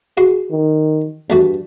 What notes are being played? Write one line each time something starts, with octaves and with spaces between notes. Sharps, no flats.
F#4 G#4 F#5 C6
D#3
E2 G2 A3 F#4